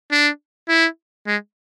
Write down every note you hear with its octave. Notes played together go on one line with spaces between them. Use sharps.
D4
E4
G#3